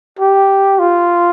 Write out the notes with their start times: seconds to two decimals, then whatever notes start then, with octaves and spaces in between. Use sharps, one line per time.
0.19 G4
0.79 F4